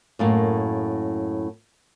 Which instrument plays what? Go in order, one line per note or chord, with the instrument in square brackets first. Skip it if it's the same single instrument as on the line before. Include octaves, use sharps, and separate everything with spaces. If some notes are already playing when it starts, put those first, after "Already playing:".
[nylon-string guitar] F#2 A2 A#3